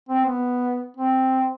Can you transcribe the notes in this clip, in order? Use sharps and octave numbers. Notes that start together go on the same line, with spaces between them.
C4
B3
C4